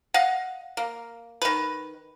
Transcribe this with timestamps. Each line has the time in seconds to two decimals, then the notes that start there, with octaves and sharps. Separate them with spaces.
0.14 D#5 F5 F#5
0.77 A#3
1.42 D#3 B4